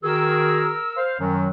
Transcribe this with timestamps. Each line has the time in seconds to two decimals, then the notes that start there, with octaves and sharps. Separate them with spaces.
0.04 D#3 F#4 G#4 A#4 E6
0.97 C5 F5
1.20 F#2 D#3 F#3